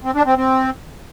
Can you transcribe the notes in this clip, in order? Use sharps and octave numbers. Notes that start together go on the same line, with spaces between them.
C4
D4
C4
C4